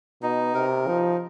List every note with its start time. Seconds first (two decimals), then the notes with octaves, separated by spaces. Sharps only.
0.22 B2 D#4
0.55 C3 A#4
0.87 F3 D#4